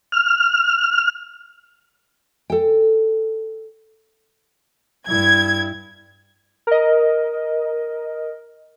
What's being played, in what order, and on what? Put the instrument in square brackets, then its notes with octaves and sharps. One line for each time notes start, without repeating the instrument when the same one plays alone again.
[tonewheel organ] F6
[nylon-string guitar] A4 G5
[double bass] G2 E4 [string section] G#6
[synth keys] A#4 D#5